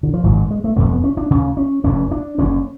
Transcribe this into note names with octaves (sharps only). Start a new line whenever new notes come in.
D3
F3
G#1 G#2 F#3
G#3
G#3
A3
F1 F2 D3 A3
B3
C#4
D4
D2 C#3 C#4
C#4
F1 F2 D3 C#4
D4
F#1 F#2 D3 C#4